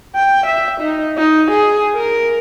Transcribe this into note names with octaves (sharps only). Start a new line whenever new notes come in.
G5
E5
D#4
D#4
G#4
A#4